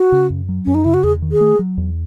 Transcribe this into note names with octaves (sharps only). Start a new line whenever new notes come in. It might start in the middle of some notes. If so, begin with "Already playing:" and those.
Already playing: F#4
C#3
F#2
F#3
F#2 C#4
D#4
C#3 E4
F#4
E2 G#4
D#3
G#4
A3
F#3
E2